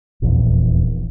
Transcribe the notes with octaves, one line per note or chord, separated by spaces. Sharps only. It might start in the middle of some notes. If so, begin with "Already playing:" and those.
D#1 A#1 E2